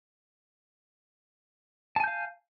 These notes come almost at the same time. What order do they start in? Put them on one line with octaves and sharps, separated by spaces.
A5 G#5 G6 F5